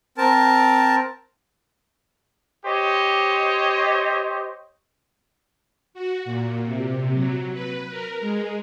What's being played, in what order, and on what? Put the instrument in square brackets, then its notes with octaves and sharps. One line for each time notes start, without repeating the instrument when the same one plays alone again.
[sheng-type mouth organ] C4 A#4 A5
[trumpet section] G4 C5 C#5 D#5
[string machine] F#4
A#2
C3
F#3
B4
A#4
G#3